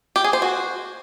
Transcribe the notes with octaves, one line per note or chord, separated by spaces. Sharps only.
G4
G#4
C5
F#4